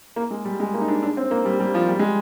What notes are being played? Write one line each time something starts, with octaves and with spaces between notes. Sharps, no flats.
A#3
G#3
G3
G#3
A#3
D#4
D4
D4
C4
A#3
G3
G3
F3
G3
G#3